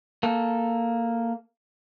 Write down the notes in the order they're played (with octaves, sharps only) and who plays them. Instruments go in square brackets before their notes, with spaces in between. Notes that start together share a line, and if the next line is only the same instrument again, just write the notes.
[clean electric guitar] A#3 A4